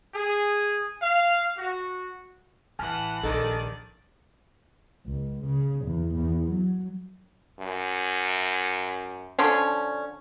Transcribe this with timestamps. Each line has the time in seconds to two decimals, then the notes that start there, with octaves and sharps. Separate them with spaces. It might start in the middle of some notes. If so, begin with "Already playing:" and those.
0.13 G#4
1.02 F5
1.57 F#4
2.79 A1 E3 F#5 G#5 A5 F6
3.23 A#1 D#3 A#3 D#4 A4 D5
5.07 C#2
5.46 C#3
5.85 E2
6.14 E2
6.50 F#3
7.60 F#2
9.39 D3 F3 C#4